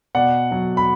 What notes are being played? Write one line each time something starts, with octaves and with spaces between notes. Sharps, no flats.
B2 D5 F#5
F#3
B5